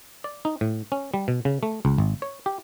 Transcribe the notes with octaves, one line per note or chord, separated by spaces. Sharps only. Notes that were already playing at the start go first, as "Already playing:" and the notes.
D5
D#4
A2
C#4
G3
B2
C#3
A3
C#2
G#1
C#5
G4